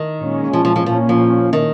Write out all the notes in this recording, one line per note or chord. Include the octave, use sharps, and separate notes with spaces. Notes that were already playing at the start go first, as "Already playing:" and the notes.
Already playing: D#3
A#2 G#3 C#4
F3
F3
F3
A#2 F3 A#3 C#4
F3
D#3